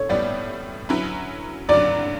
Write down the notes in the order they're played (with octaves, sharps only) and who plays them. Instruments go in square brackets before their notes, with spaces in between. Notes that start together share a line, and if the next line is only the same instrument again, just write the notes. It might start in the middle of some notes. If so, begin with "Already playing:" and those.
Already playing: [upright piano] A4 C#5
[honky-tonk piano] A2 G3 B3 [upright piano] D5
[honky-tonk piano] D3 F#3 C#4 E4 B4
[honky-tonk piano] G2 D3 F#3 [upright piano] D5